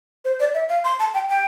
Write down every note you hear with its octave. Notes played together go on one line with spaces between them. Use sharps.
C5
D5
E5
F5
C6
A5
G5
G5